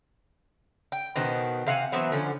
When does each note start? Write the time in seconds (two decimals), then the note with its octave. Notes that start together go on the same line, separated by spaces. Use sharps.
0.92 G5
1.16 B2 D#3 B3 C4
1.67 C3 F5 F#5 G#5
1.92 E3 F#3 B3 C4
2.12 D3 F3 C#4